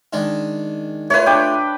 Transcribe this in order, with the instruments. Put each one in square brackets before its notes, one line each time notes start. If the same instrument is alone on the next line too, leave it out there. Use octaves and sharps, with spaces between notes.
[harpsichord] D#3 G#3 D4
[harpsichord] A3 F4 [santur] B4 C#5
[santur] D4 G5